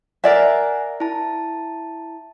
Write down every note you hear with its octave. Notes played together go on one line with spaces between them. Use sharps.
A#4 D5 E5 F#5 G#5
E4 A5